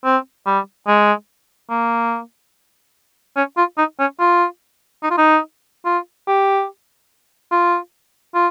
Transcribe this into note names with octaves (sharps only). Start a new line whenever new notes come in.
C4
G3
G#3
A#3
C#4
F4
D#4
C#4
F4
D#4
F4
D#4
F4
G4
F4
F4